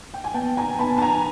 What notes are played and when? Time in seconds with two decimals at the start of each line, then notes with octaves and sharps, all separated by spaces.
0.14 G5
0.24 G#5
0.34 B3 G5 A5
0.57 G#5 A#5
0.79 B3 A5 B5
0.98 A5
1.02 G#5 A#5